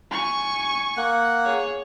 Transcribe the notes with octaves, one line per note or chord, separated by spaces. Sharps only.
G#5 C#6
A#3 F#5
G#4 C#5